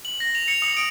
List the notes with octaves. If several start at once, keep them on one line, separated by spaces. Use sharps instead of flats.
F#7
A#6
F7
C#7
D#6
D7